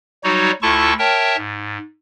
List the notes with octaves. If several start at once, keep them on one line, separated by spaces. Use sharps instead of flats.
F#3 G3 D#4 F#4 C#5
D2 E4 F4 A4 A5 C#6
A#4 C#5 E5 G5 A5
G#2